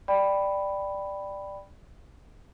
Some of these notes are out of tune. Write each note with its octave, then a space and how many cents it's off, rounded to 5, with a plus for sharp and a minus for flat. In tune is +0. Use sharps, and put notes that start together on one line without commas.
D5 +5 G5 +0 B5 +0